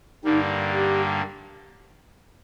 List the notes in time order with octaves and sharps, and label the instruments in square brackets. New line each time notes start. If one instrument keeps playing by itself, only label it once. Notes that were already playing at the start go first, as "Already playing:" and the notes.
[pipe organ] G2 D3 G3 A#3 [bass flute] D#4
[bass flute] G4